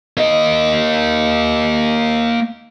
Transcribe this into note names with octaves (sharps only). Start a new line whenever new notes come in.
A#3 D#5